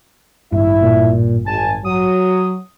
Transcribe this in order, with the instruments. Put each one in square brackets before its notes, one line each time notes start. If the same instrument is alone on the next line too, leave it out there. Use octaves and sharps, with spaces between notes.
[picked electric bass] A1 G2 [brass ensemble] E4 E5
[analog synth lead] A#2
[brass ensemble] G#1 G#5 [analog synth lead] A5
[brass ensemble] F#3 [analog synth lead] D#6